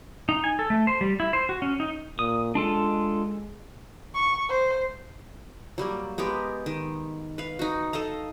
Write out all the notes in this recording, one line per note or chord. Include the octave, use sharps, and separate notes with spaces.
D#4
G#5
A4
A3
C5
G3
E4
C5
F#4
C#4
D#4
A#2 D#6
G#3 D4 F4 A4
C#6
C5
F#3 G3 A#3
G#3 B3 G4 A#4
D#3
B4 F5
D#4 F#4
A4 D#5 F5 A#5